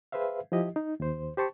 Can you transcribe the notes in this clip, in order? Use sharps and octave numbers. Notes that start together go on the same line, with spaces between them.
G#4 B4 C5 E5 F5
F3 E4 G4 D#5
D#4
D#2 C5
G4 C5 A5 C#6